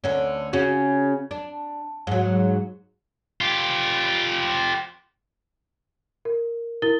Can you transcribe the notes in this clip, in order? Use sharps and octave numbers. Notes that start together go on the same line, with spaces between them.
D2 D3 C#4
C#3 C#4 F#4
D4
G#2 F#3
F4 G4
A#4
E4 A#4 A6 G7